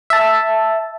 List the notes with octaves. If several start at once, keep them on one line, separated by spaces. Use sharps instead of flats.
E5 A5